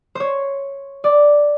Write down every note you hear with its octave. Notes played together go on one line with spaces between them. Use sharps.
C5 C#5
D5